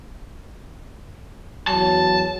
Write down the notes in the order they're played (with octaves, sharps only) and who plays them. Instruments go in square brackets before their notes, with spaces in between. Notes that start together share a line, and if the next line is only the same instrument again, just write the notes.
[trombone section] E2 F#3 [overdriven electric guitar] A5